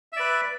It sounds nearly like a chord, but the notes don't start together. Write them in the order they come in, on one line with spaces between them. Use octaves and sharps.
E5 D5 B4